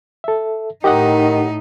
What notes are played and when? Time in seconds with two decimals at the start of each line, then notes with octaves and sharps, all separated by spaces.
0.24 A4 E5
0.84 A2 D#3 D#4 G4 D#5 F#5